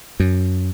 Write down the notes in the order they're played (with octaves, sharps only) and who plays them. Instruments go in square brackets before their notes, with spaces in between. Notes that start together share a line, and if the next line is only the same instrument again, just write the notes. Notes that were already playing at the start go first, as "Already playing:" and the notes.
[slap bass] F#2